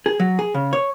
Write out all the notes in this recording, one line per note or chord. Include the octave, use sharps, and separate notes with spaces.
G#4
F#3
G#4
C#3
C#5